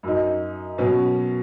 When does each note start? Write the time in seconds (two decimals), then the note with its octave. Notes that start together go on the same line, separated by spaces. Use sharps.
0.03 F#2 F#3 D#4
0.78 B2 F#3 C#4